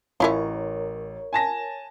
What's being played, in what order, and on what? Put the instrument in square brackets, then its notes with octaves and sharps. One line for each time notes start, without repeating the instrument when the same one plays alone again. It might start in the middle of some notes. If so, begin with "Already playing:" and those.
[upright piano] A1 [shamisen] C#4 E4 F4 [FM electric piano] A#4 C#5
[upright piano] G#5 A5 A#6